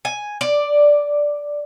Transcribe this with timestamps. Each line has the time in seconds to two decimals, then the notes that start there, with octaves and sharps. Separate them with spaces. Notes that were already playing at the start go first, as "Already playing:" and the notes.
0.05 G#5
0.41 D5